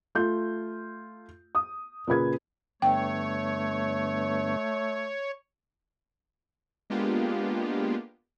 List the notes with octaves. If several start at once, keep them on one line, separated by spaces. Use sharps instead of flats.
A3 F4 G6
D#6
A#2 C#3 B4 G#6
G2 D3 A3 B3 C#5 G5
G#3 A#3 B3 D4 F4 G4